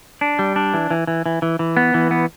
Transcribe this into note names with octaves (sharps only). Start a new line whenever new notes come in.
D4
G3
D4
E3
E3
E3
E3
E3
E3
B3
E3
B3